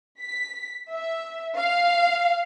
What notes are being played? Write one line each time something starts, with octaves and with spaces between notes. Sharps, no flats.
B6
E5
F5